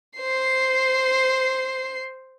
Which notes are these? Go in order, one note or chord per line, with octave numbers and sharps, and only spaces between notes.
C5 C7